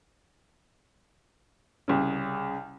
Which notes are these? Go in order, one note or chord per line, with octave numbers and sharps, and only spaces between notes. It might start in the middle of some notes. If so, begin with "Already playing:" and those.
C2 C#3